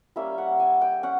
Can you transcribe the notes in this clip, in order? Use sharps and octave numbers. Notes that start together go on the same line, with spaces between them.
G3 A#3 C#4 E5
F#5
G#5
G5
C#4 F#5